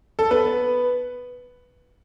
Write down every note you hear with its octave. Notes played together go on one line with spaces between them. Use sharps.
A4
B3 B4